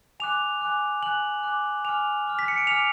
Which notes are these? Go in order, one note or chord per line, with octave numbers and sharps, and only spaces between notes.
G#5 D6 F#6 F7
G#5 D6 F#6
G#5 D6 F#6 F#7
G#5 D6 F#6
G#5 D6 F6 F7
G#5 D6 F6
B6
C#7
D7
G#5 D6 F6 F7